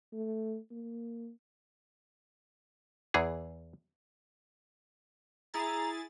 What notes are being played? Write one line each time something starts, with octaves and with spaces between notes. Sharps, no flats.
A3
A#3
E2 E3 G#4
E4 G#4 A#5 A6